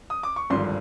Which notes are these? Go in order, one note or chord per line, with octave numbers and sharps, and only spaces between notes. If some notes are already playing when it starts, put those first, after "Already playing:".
D#6
D6
C#6
G#1 G2 D3 F3 C6